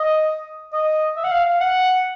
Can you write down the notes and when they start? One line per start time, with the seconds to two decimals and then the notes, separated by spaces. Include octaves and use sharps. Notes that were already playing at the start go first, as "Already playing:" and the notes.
Already playing: D#5
0.73 D#5
1.17 E5
1.24 F#5
1.31 F5
1.45 F5
1.60 F#5